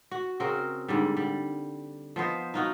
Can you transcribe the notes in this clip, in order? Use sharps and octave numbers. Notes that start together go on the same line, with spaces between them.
F#4
C#3 C4 F#4 A#4
G#2 D3 G3
G3
F3 B3 C5 D#5
D#4 F4 F#4